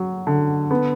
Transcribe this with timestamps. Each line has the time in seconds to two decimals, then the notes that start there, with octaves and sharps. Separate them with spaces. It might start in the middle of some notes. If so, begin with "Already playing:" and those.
Already playing: F#3
0.27 D3
0.71 B3